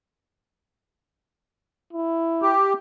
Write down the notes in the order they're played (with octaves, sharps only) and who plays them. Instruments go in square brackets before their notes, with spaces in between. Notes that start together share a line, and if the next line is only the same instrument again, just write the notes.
[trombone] E4
[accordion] G4